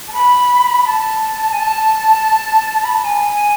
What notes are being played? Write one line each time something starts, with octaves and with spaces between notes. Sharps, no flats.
A5
B5
A5
G#5
A5
B5
A5
G#5